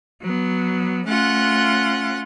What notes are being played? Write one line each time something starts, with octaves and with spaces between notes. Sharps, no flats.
F#3 B3
A3 C#4 F4 F#5 F#6